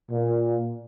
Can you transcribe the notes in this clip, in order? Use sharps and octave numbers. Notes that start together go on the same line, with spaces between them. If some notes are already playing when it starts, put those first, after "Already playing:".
A#2